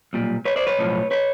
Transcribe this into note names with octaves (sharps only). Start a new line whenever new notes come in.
B1 A#2 G3
B4 C#5
C5 D5
B4 C#5
B1 A2 F3
B4 C#5